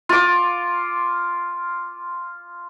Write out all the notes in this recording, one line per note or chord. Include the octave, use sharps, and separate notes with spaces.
F4 D6